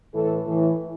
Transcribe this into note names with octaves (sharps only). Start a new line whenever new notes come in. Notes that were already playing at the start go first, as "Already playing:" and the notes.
A2 E3 A4
A2 E3